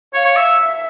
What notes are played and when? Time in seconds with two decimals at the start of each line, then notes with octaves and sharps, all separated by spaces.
0.14 C#5 F5
0.25 C#5
0.36 E5
0.60 E5